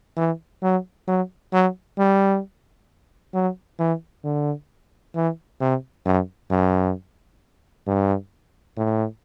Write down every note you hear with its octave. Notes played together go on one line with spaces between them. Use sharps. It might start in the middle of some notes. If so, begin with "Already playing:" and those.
E3
F#3
F#3
F#3
G3
F#3
E3
D3
E3
C3
F#2
F#2
G2
A2